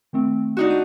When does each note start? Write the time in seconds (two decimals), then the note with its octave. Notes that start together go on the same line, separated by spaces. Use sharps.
0.13 D#3 A3 C4
0.57 D4 D#4 F#4
0.70 G6 D#7